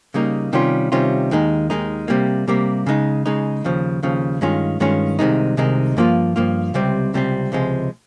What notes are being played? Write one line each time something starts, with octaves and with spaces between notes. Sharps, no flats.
C#3 G3 A#3 D#4
C3 D#3 G3 C#4 F4
C3 D#3 G3 C#4 F4
D#2 D#3 G#3 D#4
D#2 D#3 G#3 D#4
C3 G3 A#3
C3 G3 A#3
C#3 G#3 D#4
C#3 G#3 D#4
D#2 C#3 F3
D#2 C#3 F3
G2 D#3 G#3 C#4 F4
G2 D#3 G#3 C#4 F4
C2 C3 D#3 G#3 D#4
C2 C3 D#3 G#3 D#4
G2 F3 A#3 F4
G2 F3 A#3 F4
C#2 C3 G3 C4
C#2 C3 G3 C4
C#2 C3 F3 G#3